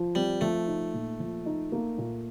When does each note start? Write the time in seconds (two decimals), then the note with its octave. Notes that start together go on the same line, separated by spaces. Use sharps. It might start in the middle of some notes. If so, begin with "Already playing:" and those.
Already playing: F3
0.15 G3 C4
0.41 F3 A3
0.67 D#4
0.94 A#2
1.20 F3
1.46 D#4
1.72 A#3
1.98 A#2